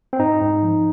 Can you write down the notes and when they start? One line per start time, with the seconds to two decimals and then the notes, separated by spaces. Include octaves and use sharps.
0.13 C4
0.19 G#2 D#4
0.41 G#2
0.63 F3